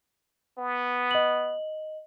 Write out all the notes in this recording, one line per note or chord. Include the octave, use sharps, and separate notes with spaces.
B3
D#5 F#7